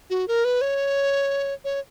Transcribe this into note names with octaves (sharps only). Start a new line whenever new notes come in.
F#4
A#4
B4
C#5
C#5